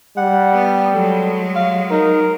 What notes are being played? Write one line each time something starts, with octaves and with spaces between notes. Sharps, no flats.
G3 F#5
B3
F#3 G#3 A4
F5
D#4 A#4